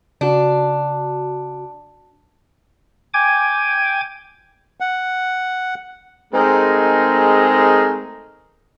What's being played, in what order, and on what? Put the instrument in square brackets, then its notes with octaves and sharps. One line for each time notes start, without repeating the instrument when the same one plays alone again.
[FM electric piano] C#3 F#4 [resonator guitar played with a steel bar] D4
[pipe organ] G5 G#5 D6 G#6
[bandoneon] F#5
[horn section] G#3 A3 C4 D#4 G#4 A#4